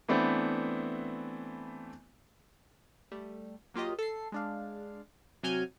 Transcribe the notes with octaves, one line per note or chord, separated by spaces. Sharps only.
E3 A3 B3 C4 D4
G3 A3
F#3 A#3 F4 G4 D#5
A4 C7
G#3 D4 F5
C3 F#3 F#4 G#5 F6 G6